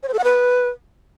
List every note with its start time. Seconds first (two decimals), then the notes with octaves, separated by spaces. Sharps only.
0.03 C#5
0.08 C5
0.13 A4
0.19 F#5
0.24 B4